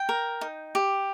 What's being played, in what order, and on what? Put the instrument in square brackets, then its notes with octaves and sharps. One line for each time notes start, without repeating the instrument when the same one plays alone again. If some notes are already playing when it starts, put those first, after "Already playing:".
Already playing: [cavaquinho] G5
A#4
D#4
G4